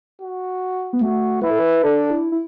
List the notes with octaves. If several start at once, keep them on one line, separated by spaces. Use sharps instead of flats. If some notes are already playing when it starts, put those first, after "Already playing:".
F#4
B3
A3 F#4
E4 B4
A4
B4
D4 A4
E4
E4